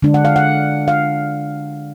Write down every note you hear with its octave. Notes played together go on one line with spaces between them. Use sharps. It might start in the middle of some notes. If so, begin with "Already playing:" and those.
D3 G#3 D4
F#5
F5
F#5
F5